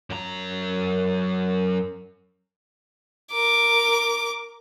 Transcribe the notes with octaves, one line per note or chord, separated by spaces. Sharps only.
F#2 A#5
A#4 D6